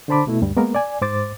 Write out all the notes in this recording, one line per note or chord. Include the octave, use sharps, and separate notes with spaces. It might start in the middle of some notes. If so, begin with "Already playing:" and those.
D3 D4 C5 A5 B5 D6
B2 A3 E4
D2 G2 G3
G#3 A#3 B3 A#4
D5 G#5
G#2 C5 D6 A6